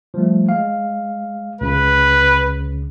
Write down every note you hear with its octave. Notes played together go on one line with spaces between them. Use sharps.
F3 G3 A3
G#3 F5
C#2 C#3 B4